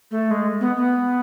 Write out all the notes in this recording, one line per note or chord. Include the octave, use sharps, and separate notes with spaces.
A3
G#3
B3
B3